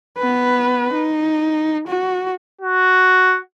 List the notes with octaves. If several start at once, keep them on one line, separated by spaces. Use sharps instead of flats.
B3 B4
D#4
F#4
F#4